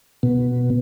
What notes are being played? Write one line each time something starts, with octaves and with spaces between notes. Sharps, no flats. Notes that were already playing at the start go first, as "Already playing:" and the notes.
B2